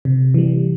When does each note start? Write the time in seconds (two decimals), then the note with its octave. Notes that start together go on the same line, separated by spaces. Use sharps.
0.05 C3
0.34 E3 G3